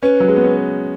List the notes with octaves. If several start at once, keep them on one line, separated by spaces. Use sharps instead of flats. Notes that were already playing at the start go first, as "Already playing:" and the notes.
C#4 B4
F#3
G#3
B3
C#4